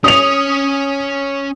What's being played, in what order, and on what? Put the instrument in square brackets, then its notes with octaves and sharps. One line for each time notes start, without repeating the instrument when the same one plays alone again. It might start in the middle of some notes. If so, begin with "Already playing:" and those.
[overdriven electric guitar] C#4 C#5 [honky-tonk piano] D#6 F7